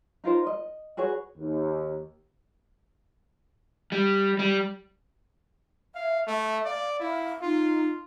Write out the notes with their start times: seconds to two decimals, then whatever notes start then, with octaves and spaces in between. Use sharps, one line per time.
0.24 D#4 F4 A#4 C5
0.47 D#5
0.97 F#4 G#4 B4 C#5
1.37 D#2
3.92 G3
4.39 G3
5.95 E5 F5
6.27 A3 E5
6.65 D5 F5
7.00 E4 F5
7.42 D#4 F4